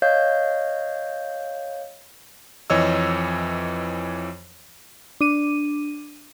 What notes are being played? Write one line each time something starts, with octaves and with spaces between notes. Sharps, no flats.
C#5 D#5 F5 G6
F2 E3 C#5 D#5 E6
D4 D#7